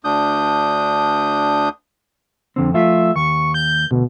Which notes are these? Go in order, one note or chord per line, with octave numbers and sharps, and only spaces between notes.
D2 D4 D#6 G6
F2 D3 C4
F3 A3 F4 E5
D#2 C#6
G6
D2 B2